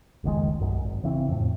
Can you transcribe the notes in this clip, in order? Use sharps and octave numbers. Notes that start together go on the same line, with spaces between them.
F1 C#2 D#3 G#3
B1 F#2
G#1
C#3 E3 C4
F2 A2